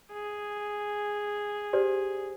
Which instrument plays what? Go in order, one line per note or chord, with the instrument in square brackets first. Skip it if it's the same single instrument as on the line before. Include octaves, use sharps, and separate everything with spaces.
[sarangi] G#4
[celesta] G4 C5 D5